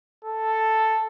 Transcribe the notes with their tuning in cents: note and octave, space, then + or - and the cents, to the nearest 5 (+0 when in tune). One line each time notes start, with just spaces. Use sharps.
A4 +0